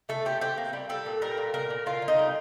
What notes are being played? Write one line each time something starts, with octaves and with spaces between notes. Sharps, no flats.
A3 A4
C4 G4
C4 G4
A#3
G3
G3 A4
A#2
G3 A#4
A#2
A#2 A#4
A#2
D3 F4
D3
D#4
G3